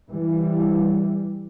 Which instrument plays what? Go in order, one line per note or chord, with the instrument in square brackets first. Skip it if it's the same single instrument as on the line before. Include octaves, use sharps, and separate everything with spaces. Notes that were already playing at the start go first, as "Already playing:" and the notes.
[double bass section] E3 G3